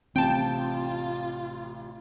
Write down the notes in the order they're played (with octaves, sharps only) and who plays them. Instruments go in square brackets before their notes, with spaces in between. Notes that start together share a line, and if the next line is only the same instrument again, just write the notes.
[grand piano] A1 A2 C3 [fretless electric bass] C4 [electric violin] F4 [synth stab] G5 A5